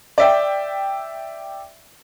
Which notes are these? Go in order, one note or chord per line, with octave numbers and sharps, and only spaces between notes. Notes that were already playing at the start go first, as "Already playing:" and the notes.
D5 E5 G5